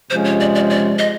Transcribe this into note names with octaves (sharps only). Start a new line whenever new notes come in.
C3 F3 G#3 C#4 C5
C#5
D5
D5
D5
D#5